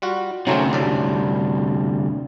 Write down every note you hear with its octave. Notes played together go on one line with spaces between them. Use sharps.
G3 F4 F#4
D2 C3 F#3 A3 C4 C#4 D#4 G#4
C2 C#3 G3 D4 D5